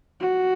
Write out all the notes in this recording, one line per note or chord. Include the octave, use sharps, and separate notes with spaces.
F#4